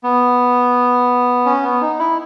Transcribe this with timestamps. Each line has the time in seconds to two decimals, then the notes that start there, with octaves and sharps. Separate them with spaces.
0.04 B3
1.46 C#4
1.63 B3
1.81 D#4
1.99 E4